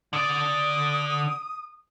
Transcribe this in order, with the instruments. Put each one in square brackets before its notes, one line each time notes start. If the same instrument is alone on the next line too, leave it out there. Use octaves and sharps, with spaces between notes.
[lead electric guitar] D3 D5 [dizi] D#6